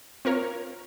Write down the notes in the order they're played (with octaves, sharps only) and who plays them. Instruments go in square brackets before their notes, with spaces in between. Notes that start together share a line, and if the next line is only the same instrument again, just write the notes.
[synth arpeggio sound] C4 F4 A#4 C#5